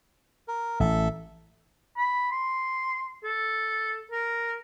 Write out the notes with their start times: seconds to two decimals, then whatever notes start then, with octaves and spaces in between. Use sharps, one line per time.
0.48 A#4
0.80 A1 A4 E5
1.97 B5
2.31 C6
3.24 A4
4.12 A#4